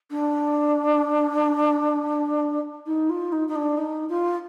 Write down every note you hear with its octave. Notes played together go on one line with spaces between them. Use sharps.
D4
D#4
F4
D#4
D#4
D4
D#4
F4